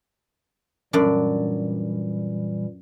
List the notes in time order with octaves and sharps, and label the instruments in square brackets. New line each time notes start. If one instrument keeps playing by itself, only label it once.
[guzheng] F#2 D4 [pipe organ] A#2 E3 G3